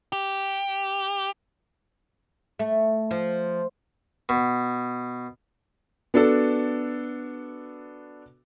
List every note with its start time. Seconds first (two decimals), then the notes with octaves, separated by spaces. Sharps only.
0.13 G4
2.59 A3
3.11 F3
4.29 B2
6.14 B3 D4 F#4 A4